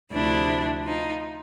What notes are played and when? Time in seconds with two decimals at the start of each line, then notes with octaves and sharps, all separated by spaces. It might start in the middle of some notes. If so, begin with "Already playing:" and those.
0.12 D2 C3 F3 D4 E4
0.85 D#4 F4